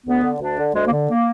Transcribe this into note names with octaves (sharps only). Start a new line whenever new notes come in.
D2 B3
D3
D2 D4
D3
D2 G#3
A#3
D3
A#3